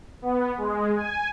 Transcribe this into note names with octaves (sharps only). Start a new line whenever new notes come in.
B3
G#3
G#5